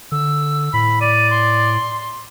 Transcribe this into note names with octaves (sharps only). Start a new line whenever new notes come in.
D3 E6
A2 B5
D5 D#7
C6